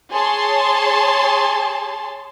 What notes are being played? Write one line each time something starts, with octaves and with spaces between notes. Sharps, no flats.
G#4 C#5 A5 C6